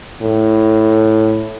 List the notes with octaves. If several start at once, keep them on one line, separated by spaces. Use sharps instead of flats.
A2